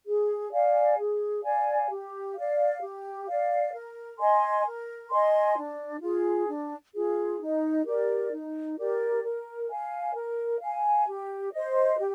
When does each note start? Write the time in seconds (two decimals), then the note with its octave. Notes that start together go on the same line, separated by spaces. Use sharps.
0.06 G#4
0.52 D5 F5 G#5
0.98 G#4
1.43 D5 F5 G#5
1.89 G4
2.35 D5 F5
2.81 G4
3.27 D5 F5
3.73 A#4
4.19 D#5 G#5 C6
4.65 A#4
5.10 D#5 G#5 C6
5.56 D4
6.02 F4 G#4
6.48 D4
6.94 F4 G#4
7.40 D#4
7.85 G4 A#4 D5
8.31 D#4
8.78 G4 A#4 D5
9.24 A#4
9.68 F5 G#5
10.14 A#4
10.61 F5 G#5
11.07 G4
11.53 C5 D#5
11.98 G4